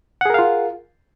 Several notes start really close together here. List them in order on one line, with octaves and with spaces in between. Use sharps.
F#5 G#4 A#4 F5 F4